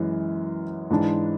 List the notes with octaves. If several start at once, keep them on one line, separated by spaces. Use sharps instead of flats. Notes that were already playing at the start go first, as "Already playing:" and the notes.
Already playing: F#2 E3 G#3
G#2 E3 G#3 D4